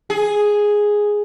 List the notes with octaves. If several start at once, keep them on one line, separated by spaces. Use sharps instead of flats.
G#4